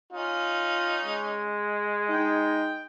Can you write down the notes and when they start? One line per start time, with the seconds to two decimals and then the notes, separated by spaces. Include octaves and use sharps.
0.13 C#4 D#4 F4
1.05 G#3
2.10 D#4 G5